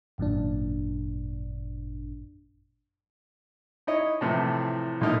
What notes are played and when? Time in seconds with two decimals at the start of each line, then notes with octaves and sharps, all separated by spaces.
0.18 G#1 F#2 A#2 D4
3.87 D#4 E4 C#5 D#5
4.21 A2 C3 E3 F3 A3
5.01 B1 A#2 A3 D#4 E4 F6